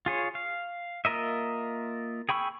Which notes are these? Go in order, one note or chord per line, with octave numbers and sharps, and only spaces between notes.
F4 G#4 C#5
F5
A#3 F4 A#4 D#5 E5
G#4 G5 B5 C#6 E6